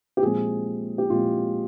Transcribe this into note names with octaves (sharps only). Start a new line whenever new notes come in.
G4
A#2 F3 G#3 C4 G#4
G4
A#2 F3 G#3 C4 F4